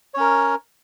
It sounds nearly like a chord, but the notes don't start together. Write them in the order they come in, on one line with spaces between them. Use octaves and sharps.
C#5 C#4 A#4